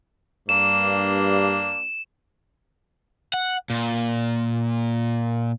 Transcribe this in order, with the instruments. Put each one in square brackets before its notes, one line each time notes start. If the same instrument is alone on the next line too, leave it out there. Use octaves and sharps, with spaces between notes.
[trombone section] G2 [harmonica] A#3 D4 [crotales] E7
[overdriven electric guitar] F#5
A#2